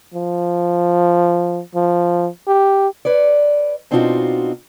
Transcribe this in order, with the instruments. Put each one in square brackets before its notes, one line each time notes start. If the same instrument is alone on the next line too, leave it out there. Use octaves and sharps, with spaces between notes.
[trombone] F3
F3
G4
[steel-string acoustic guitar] B4 C#5 D5
B2 C4 D4 D#4 F4 F#4